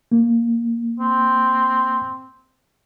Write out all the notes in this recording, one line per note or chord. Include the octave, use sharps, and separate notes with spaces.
A#3
C4